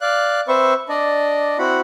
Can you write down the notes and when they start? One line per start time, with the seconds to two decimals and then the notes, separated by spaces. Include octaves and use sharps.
0.01 D5 F5 F#6
0.48 C4 B4 C5 E5 C#6
0.89 D4 D5 D#5
1.58 C4 E4 F#4 F#5 B5